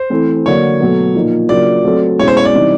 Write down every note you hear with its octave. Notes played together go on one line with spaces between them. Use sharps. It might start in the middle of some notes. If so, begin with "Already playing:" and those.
Already playing: C5
E3 A3 C4
D3 F#3 A#3 C#5
B2 F#3 A3
A#2 F3 A#3 D#4
C#3 F#3 A#3 D4 F4 D5
F#3 A3 C4
B2 G#3 C#4 E4 C#5
C5
C#5
D5
C3 E3 G3 C4 D#4